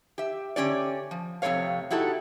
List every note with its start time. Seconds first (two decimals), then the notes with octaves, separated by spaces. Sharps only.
0.18 G4 E5
0.56 D3 C#4 G4 D5
1.11 F3
1.42 F2 C3 E3 A3 C#5 F5
1.90 D#4 E4 F#4 G4 A4